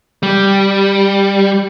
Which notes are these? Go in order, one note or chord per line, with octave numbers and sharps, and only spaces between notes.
G3